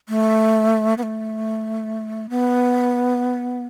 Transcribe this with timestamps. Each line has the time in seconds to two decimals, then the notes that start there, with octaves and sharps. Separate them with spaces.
0.09 A3
0.98 B3
1.03 A3
2.30 B3